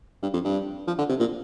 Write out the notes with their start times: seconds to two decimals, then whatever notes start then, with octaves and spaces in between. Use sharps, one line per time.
0.23 G2
0.34 F2
0.44 G2
0.88 F3
0.99 D3
1.09 C3
1.20 A#2